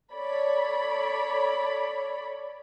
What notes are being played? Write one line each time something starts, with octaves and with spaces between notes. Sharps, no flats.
A4 C#5 D5 B5